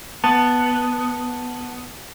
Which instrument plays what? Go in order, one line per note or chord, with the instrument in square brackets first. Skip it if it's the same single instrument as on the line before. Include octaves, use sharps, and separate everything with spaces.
[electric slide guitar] B3 [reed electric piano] A5